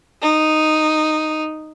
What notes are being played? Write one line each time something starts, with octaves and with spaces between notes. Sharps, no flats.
D#4